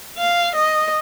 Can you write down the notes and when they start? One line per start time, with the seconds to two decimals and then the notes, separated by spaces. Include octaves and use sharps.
0.18 F5
0.55 D#5